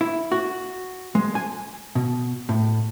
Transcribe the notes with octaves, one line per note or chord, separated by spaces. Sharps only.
E4
F#4
G#3
G#5
B2
A2